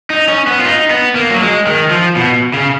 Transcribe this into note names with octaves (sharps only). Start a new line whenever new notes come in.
D#4
C#4
B3
F4
D#4
B3
A#3
F#3
G#3
D#3
F3
B2
C#3